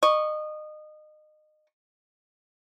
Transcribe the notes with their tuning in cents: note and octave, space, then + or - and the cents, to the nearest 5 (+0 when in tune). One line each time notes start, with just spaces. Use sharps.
D#5 -25 C#6 +0